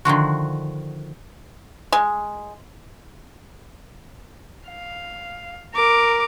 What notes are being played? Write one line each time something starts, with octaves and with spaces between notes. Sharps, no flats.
D3 D#3 F3 F#4
G#3
F5
A#4 D6